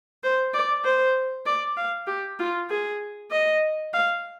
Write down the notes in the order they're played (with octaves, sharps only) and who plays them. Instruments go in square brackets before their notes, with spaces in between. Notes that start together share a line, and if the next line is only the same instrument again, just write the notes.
[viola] C5
D5
C5
D5
F5
G4
F4
G#4
D#5
F5